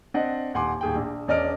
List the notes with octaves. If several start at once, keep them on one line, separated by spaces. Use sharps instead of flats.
C4 D4 D#5 F#5
D#1 F#5 G#5 C6 D6
D#1 G#4 G5
A#1
E1 C#4 D5 D#5 F6 D7